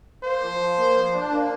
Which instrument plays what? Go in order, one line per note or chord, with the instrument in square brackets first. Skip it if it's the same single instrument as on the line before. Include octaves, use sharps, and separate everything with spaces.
[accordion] A#3 [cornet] C5
[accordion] F3
F3
A#3
F3
D4
A#3